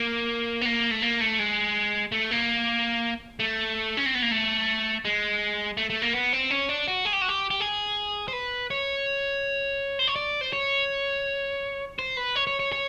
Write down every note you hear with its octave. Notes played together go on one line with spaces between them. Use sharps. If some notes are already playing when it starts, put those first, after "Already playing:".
Already playing: A#3
B3
A#3
A3
A#3
A3
G#3
A3
A#3
A3
C#4
C4
B3
A#3
A3
G#3
A3
A3
A#3
B3
C4
C#4
D4
F#4
G#4
G4
F#4
G4
G4
G#4
C5
B4
C#5
C5
C#5
D5
C5
C#5
C5
B4
C#5
C#5
C#5
C#5